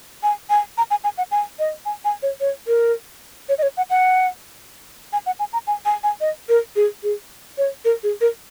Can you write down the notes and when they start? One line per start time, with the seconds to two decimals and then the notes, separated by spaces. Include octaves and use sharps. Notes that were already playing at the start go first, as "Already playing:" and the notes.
0.23 G#5
0.50 G#5
0.78 A#5
0.91 G#5
1.04 G#5
1.18 F#5
1.31 G#5
1.59 D#5
1.85 G#5
2.05 G#5
2.23 C#5
2.40 C#5
2.67 A#4
3.49 C#5
3.58 D#5
3.63 C#5
3.77 F#5
3.90 F#5
5.13 G#5
5.26 F#5
5.39 G#5
5.53 A#5
5.67 G#5
5.85 G#5
6.03 G#5
6.21 D#5
6.49 A#4
6.76 G#4
7.03 G#4
7.58 C#5
7.85 A#4
8.03 G#4
8.21 A#4